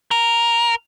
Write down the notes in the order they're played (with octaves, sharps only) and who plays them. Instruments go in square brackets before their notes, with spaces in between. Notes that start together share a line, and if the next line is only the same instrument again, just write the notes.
[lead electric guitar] A#4